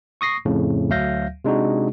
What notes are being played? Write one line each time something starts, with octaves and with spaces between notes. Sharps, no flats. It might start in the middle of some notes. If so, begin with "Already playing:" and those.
C#6 D#6 A#6 C7
F2 A2 C#3
D2 F#3 E5 F5 G6 A#6
C3 G#3 D4 D#4 F#4